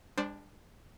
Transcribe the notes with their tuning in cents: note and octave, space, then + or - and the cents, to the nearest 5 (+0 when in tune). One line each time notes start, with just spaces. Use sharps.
G#3 -45 D4 +0 C5 +0